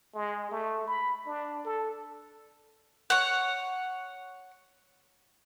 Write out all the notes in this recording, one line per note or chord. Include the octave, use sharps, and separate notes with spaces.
G#3
A3
B5
D4
A4
C#5 F#5